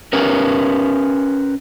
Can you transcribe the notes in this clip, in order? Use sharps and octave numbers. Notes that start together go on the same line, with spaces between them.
C#4 G4 A#4 B4